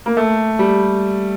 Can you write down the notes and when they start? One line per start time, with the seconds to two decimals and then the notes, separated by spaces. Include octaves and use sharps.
0.06 A#3
0.17 A3
0.59 G3